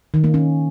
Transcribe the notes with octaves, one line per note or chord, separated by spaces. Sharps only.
D#3
A#3
C#4